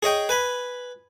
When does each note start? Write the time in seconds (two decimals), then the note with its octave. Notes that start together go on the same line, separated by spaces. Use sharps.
0.03 G#4 C#5 D#5 G5
0.29 B4 G#5 B5